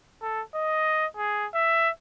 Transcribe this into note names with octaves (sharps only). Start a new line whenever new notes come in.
A4
D#5
G#4
E5